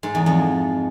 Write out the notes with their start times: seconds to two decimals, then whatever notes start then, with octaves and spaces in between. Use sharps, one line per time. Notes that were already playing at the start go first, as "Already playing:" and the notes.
0.03 G#2
0.15 E2
0.26 F2